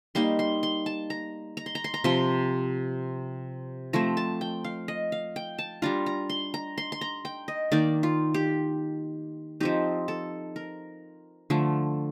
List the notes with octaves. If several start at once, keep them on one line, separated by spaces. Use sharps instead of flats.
G3 A#3 D#4 C6
C6
C6
A5
A#5
A#5
C6
A#5
C6
A#5
C3 F3 C4 C6
F3 A3 C4 A#5
A5
G5
F5
D#5
F5
G5
A5
G3 D4 F4 A#5
A#5
C6
A#5
C6
C6
A#5
G5
D#5
D#3 A#3 D#4 D5
F4
G4
F3 C4 D#4 G4
A4
A#4
D3 F3 A3